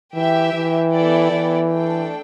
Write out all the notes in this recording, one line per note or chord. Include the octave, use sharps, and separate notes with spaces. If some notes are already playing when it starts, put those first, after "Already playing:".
E3 G4 E5 G5
E3
B3 E4 A4 D5 G5
E3
A3 D4 A4 G5